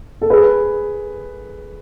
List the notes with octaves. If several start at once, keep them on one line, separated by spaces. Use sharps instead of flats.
A4
G#4 B4